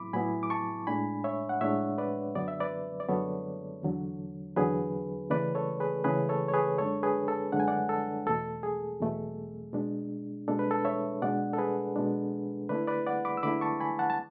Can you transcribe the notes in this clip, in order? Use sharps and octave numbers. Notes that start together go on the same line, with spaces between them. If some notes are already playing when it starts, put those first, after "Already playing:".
Already playing: A2 F#3 B3 E4 B5 D6
A2 F#3 B3 E4 G#5 B5
D6
A5 C#6
A2 G#3 D4 G#5 B5
C#5 E5
F#5
A2 G#3 D4 C#5 E5
B4 D5
F#2 D3 F#3 B3 D5
E5
B4 D5
D5
F#2 D3 F#3 B3 A4 C#5
E2 D3 F#3
E2 D3 F#3 G#4 B4
C#3 E3 A3 C#4 B4 D5
A4 C#5
G#4 B4
C#3 E3 A3 C#4 G#4 B4
A4 C#5
C#5
G#4 B4
F#2 D3 G#3 D4 A4 C#5
G#4 B4
A4
F#2 D3 G#3 D4 F#5
G#5
D5 F#5
A4
E2 B2 A3 A4
G#4
E2 B2 A3
B2 G#3 D4
B2 G#3 D4 A4
B4
A4
C#5 E5
B2 G#3 D4 D5 F#5
A4
G#4 B4
B2 G#3 D4
D3 A3 E4 B4 D5
B4 D5
D5 F#5
B5 D6
E6
D3 A3 E4 B5 D6
A5 C#6
G#5 B5
F#5 A5
A5